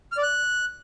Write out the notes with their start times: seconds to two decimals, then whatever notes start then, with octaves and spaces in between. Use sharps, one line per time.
0.12 F6
0.17 D5
0.23 F#6